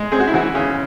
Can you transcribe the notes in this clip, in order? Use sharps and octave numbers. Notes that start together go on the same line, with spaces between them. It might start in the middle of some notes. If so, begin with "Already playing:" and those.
Already playing: G#3
C4 G#4
F#4
E4
E3 F#4
C#3